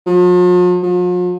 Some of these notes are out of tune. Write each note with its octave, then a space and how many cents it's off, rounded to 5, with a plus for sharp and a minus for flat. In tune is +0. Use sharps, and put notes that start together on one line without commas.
F3 +45
F3 +45